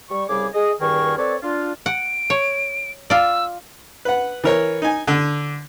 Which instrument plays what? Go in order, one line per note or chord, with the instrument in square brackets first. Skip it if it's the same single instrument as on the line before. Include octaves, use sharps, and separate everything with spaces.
[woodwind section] G3 C#6
C2 C#3 G3 G#4 D6
G#4 D#5
E2 G2 D#3 G#4 A#4 C#6
C4 A4 B4 C#5 D5
D4 F4
[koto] F#5 [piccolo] D7
[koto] C#5
[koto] F4 D5 [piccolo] E6
[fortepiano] B4 F#5
E3 A#4 C#5
D#4 G#5
D3